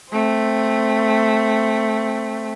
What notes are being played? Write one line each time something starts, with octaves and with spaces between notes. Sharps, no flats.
A3 C4